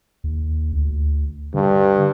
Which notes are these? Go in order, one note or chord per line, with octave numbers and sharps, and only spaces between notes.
D#2
D2
G2 D3